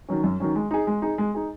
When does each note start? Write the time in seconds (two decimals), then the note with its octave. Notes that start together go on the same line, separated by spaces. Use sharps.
0.08 D#3 F#3 C#4
0.24 F#2
0.40 D#3 F#3 C#4
0.55 G#3
0.71 D#4 G#4
0.87 G#3
1.02 D#4 G#4
1.18 G#3
1.34 D#4 G#4